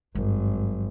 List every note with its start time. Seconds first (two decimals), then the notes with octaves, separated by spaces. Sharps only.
0.15 G#1 G2 F#3